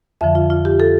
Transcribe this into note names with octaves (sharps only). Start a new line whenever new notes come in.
F2 D3 F3 E5
F4
F4
G4
A4